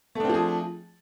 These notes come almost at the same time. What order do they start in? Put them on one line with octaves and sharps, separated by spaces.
A3 D4 C4 F3 G#4